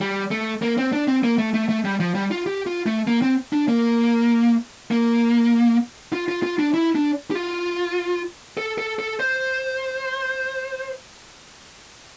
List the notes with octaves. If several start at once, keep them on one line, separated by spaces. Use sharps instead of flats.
G3
A3
A#3
C4
D4
C4
A#3
A3
A3
A3
G3
F3
G3
F4
G4
F4
A3
A#3
C4
D4
A#3
A#3
F4
F4
F4
D4
E4
D4
G4
F4
A4
A4
A4
C5